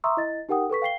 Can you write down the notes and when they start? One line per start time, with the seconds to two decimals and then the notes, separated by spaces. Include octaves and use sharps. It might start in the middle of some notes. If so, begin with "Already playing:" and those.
0.04 E5 A#5 C6 C#6 D#6 E6
0.17 E4 D#5 A6
0.49 D#4 G4 A#4 F#5 G5 D#6
0.70 A4 B4 C#6 B6
0.82 F5 G5 C7 G7